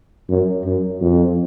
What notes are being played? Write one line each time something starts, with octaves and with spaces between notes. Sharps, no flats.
F#2
F#2
F2